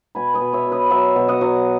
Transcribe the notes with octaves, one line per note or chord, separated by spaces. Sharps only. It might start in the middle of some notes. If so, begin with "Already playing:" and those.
B2 G#5 B5
B4 D#5
B2
C#5 E5
B2
B4 D#5
F#3 C#5 E5
B2
D#5 F#5
F#3